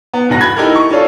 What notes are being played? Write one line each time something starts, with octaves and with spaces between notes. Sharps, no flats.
B3
F1 E2 G2 F#4 A#6
B5 G#6
D#4 E4 G4 A4 A#4
C#6
C#4 D4 F4 A4